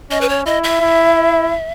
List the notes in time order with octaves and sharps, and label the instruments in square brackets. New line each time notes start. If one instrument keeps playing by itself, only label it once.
[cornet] C#4 [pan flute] D#5
[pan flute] B4
C#5
[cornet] E4 [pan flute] D#5
[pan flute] E5
[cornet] E4